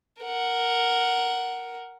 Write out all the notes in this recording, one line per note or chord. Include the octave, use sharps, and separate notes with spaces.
A#4 F#5